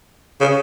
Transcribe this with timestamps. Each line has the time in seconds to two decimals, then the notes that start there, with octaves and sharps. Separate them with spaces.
0.41 C#3